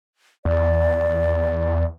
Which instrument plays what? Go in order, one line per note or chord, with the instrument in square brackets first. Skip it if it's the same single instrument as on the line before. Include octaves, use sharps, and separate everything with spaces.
[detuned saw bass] E2 [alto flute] D5